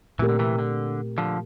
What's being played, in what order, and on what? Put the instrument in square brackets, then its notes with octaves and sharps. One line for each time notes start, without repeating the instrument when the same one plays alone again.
[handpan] A#2 A3 C4 G4 A#4 [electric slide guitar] E3
[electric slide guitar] D3
C3 E3
D3
D3 F3